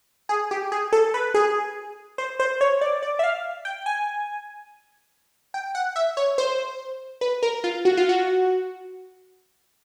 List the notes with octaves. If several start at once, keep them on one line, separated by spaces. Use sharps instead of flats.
G#4
G4
G#4
A4
B4
G#4
C5
C5
C#5
D5
D5
E5
F5
G5
G#5
G5
F#5
E5
C#5
C5
B4
A#4
F4
F#4
F4
F#4